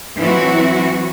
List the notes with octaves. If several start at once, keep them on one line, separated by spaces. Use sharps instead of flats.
E3 F#3 C4 E4 F#4